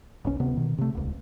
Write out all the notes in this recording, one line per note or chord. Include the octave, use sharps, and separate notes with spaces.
F#1 B1 C#4
D1 C3 B3
B2 D#3
C3 A3
D#1 C#2